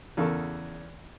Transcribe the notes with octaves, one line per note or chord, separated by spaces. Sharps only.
E2 C#3 A4 A#4 C#6